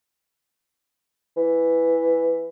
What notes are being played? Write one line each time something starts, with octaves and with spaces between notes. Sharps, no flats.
E3